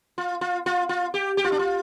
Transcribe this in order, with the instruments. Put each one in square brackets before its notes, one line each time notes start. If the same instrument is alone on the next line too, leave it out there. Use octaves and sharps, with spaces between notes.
[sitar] F4
F4
F4
F4
G4
G4
F4
D4
F4